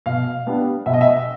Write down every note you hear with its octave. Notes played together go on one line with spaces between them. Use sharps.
B2 F5
G3 B3 D4
B2 E5
D#5
E5